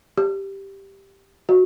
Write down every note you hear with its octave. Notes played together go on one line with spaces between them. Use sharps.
G4
F#4